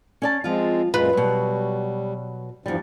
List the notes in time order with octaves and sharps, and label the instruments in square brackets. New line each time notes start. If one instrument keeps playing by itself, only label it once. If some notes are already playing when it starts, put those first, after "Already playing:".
[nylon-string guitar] C#4 D5 A5
[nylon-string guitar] F3 F4 [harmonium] G#3 C4
[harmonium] F#2 A#2 G#3 [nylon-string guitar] F4 [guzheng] B4
[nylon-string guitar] B2 F#3 [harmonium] G3
[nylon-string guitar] E2 G3 [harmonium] G2 F3